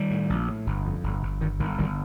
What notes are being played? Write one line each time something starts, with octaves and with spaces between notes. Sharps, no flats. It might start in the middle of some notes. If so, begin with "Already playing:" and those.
Already playing: D#3 G3
A2
A#1
A2
G1
F2
G1
G1
G1 D#3
G1 D#3
G1 D#3 G3